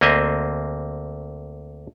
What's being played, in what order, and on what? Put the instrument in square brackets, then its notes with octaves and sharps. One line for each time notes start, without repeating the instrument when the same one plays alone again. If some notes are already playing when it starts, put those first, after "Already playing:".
[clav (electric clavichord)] D2 A#3 C4 D#5 E5